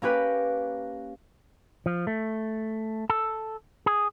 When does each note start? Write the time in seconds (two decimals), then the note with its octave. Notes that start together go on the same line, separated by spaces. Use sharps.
0.02 A#3 C#4 G4 B4
1.86 F3
2.07 A3
3.10 A4
3.86 G#4